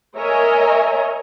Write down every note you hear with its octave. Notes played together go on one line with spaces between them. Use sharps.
A#4 C#5 D#5 E5 G#5 A#5